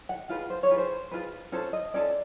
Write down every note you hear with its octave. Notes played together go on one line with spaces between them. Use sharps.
F#5
F4 G#4 B4 F5
C5
C#5
F4 G#4 B4
C5
F4 G#4 B4
C#4 F4 A4 C5
D#5
C#4 F4 A4 D5